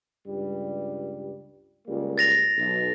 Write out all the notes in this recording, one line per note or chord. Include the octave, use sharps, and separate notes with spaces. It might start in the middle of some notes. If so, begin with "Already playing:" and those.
C#2 G2 G3
C#2 G3 A#3
A6 A#6 F7
B1